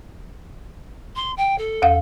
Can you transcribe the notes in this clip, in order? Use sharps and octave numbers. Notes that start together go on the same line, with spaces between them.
C6
G5
A4
E2 F5 F#5